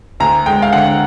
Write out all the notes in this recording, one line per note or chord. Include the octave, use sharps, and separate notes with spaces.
D2 A#5
G#3 G5
F5
D3 F#5